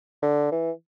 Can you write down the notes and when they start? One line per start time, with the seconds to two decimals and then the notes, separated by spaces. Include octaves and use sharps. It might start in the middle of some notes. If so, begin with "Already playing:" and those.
0.22 D3
0.52 E3